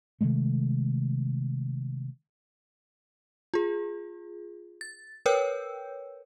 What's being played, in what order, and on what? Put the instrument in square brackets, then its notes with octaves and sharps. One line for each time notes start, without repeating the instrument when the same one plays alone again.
[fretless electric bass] C3 D#3 G#3 A3
[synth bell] F4 G#4
A6
A#4 B4 C#5 G5 E6 G6